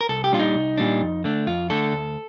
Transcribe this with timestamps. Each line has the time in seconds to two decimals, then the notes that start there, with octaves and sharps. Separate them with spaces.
0.01 A#4
0.09 C2 A4
0.24 G4
0.32 A#2 G3 D4 F4
0.39 D#4
0.54 C2
0.78 A#2 G3 D4
1.01 F2
1.24 D3 A3 D4
1.47 F2 F4
1.70 D3 A3 D4 A4
1.93 D2